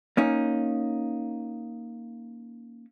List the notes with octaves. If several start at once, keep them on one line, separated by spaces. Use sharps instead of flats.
A#3 C#4 D#4